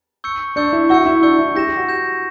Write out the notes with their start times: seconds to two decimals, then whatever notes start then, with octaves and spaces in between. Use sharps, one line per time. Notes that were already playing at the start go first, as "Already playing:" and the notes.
0.24 C#6 E6 G6 C#7
0.56 D4 C#6 E6 G6 C#7
0.73 E4
0.89 F#4 C#6 E6 G6 C#7
1.06 E4
1.23 D4 C#6 E6 G6 C#7
1.39 E4
1.55 G4 G6 A#6 E7
1.67 G4
1.77 F#4
1.89 G6 A#6 E7